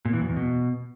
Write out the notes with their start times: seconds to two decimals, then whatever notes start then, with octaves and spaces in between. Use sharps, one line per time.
0.05 A#2
0.13 E3
0.21 F#2
0.29 E2
0.36 B2